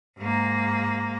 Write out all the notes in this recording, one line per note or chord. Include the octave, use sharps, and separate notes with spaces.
G#2 A#3